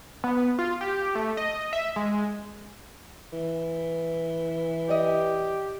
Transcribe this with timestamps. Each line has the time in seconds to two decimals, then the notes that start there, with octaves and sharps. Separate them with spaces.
0.24 B3
0.59 F4
0.81 G4
1.15 A3
1.37 D#5
1.73 E5
1.96 G#3
3.33 E3
4.89 G4 D5 D#5